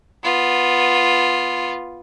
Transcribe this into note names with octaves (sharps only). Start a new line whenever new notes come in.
B3 F4